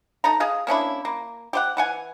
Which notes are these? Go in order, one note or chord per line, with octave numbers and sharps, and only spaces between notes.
D#4 A4 A#5
G#4 D#5 F5
A#3 C#4 D4 E4
A#3
G4 C5 F#5
E3 F#5 G#5